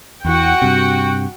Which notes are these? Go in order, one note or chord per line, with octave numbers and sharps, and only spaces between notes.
E2 E3 F#4 F#5 G5
G2 C3